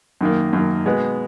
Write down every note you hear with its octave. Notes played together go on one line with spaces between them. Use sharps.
F#2 D#3 A#3
F#2 D#3 A#3
B2 G#3 B3